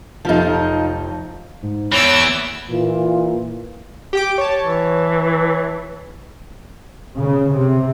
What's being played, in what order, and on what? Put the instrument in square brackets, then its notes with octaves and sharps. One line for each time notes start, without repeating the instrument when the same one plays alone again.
[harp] F1 F4 A5 [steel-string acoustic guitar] F3 D#4
[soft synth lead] G#2
[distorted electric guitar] E2 E3 [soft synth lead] C#5 [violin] D6 E6
[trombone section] A#2 E3 F4
[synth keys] G4 G5 D6
C#5 A5
[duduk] E3
[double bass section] C#3
C3